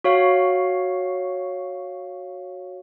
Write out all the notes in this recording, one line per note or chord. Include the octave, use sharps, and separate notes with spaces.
F#4 C#5 F5